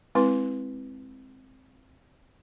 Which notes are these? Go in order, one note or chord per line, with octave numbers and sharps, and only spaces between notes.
G#3 C4 E4 B4 C6